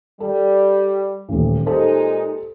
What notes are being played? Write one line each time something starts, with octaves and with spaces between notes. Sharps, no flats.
G3 A4
D#1 A1
A#2 G#3 D#4 G4 A4 C5